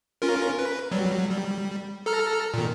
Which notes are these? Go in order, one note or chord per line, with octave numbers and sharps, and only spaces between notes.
C#4 F4 A#4
B4
F#3 G3
G3
A4 A#5 F6
A#2 D#3